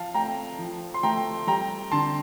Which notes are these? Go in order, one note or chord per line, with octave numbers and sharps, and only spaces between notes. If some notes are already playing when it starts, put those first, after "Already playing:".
Already playing: F3 F5 A5
A3 G5 A#5
F3
C6
A3 G5 A#5
G3 G5 A#5
D3 A5 C6